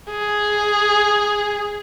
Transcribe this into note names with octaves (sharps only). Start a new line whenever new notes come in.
G#4